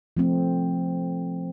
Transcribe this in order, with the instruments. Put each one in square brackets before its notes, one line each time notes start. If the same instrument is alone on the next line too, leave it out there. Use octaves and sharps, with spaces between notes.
[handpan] F3 A3 C4